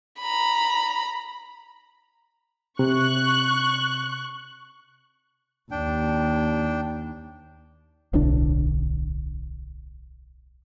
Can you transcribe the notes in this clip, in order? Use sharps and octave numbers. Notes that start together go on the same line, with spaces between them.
A#5 B5
C3 C#6 F#6
D#2 D4 G5
D1 B1 D3 D4